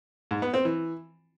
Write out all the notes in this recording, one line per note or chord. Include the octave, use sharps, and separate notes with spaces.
G#2
B3
C4
E3